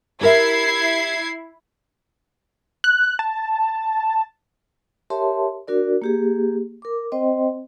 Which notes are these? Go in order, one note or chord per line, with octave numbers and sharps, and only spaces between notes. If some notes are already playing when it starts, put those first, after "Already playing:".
E4 G4 A#4 E5 G#6 C7
F#6
A5
G4 A#4 C#5 E5 A5 C6
D4 F#4 A#4 D5
A#3 G4 G#4
A#4 D6
C4 C5 D#5 G5 C6